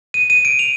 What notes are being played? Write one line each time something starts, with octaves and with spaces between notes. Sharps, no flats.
D#7
D#7
D7
F7